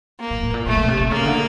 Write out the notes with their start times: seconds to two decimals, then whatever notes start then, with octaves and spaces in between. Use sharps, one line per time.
0.20 A#3
0.31 A#2
0.43 A2
0.54 A#2
0.66 B2 A3
0.77 B2
0.88 C3
1.00 C3
1.11 C#3 A#3
1.26 D3